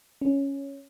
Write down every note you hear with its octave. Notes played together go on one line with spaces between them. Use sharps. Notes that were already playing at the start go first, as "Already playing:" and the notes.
C#4